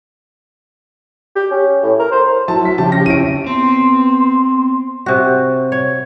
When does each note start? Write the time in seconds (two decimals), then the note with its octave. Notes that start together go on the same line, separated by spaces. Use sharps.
1.36 G4
1.51 C#4
1.83 A2
1.99 A#4
2.11 C5
2.48 F#3 E4 A5
2.65 B6
2.78 C#3 F3 G4 A5
2.92 A#6
3.06 C#4 E4 D7 D#7
3.46 B3 C4 C6
5.06 C3 F#4
5.72 C#5